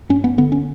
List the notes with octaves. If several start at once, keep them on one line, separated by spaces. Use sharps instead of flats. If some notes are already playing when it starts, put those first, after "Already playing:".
G2 C#4
B3
D3 B3
C#4